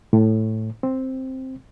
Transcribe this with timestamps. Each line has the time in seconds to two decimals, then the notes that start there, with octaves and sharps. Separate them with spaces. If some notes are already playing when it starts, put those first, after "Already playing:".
0.13 A2
0.83 C4